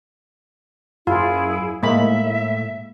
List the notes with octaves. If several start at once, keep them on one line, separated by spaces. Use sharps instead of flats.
F#2 E4 F4 G#4
A2 G#3 A#3 E5 B5